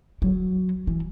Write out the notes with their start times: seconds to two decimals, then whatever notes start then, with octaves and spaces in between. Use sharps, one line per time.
0.22 F#3
0.87 E3